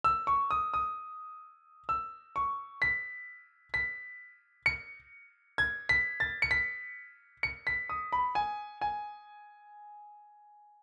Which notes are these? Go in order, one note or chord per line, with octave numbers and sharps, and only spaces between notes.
E6
C#6
D#6
D#6
E6
C#6
B6
B6
C#7
G#6
B6
A6
C#7
B6
C#7
B6
D#6
B5
G#5
G#5